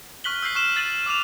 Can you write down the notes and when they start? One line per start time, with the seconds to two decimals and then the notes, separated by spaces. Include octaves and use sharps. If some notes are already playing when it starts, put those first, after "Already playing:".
0.24 C#6 F6 F#6 B6 F#7 G7
0.42 E6 G6 B6 C7 F#7
0.55 C#6 F6 F#6 E7 G7
0.76 E6 A6 C7 D#7 F#7
1.06 D6 F6 E7 F7